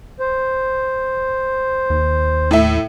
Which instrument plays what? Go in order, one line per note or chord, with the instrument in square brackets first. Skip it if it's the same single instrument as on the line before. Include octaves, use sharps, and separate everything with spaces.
[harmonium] C5
[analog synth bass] D#2
[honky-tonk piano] A2 E5